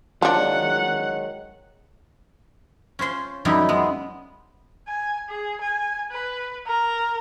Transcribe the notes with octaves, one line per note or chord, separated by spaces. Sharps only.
D#3 F3 F#3 G#3 D4 F#5
C#4 F4 C5 C6
F#2 F3 G3 D#4 E4
G#3 B3
G#5
G#4
G#5
B4
A#4